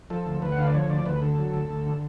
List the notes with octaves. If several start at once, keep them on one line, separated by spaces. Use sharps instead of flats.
F3 A4
D2
D2 B4
F#5
D3 F5
D5
F3 C#5
D2 D5
D2 B4
D3 A4
F#3
D2
D2
D3